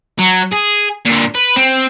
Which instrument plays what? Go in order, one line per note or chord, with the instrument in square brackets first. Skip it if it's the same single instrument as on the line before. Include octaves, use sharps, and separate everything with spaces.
[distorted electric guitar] F#3
G#4
A#2 D3
B4
C4